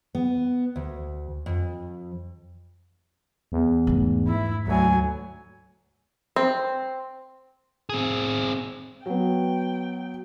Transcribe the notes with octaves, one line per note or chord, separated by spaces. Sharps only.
B3
D2
F2
E2
G#2 A3
E4
D2 F#3 G#5
C4
C4 G#4
F#3 B3 G5